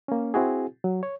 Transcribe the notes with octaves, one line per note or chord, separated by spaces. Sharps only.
A#3 C#4
C4 E4 F#4 G#4
F#3
C#5